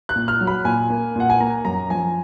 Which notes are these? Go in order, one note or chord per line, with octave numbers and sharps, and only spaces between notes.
F#6
A#2
F6
F#3
B5
A#2 G#5
A#3
A#2 F#5
G#5
A#3 A#5
F#2 A#5
F3 G#5